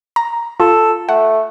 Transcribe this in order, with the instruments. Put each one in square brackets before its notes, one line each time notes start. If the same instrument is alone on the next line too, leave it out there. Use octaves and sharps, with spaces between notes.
[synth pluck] A#5
[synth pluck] F4 [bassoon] A4
[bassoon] A3 [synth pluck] F#5